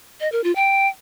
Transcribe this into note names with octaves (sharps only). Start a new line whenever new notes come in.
D#5
A#4
F4
G5